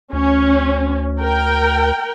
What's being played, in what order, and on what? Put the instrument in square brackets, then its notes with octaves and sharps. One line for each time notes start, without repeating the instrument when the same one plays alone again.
[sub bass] D2 [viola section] C#4
[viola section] A#4 G5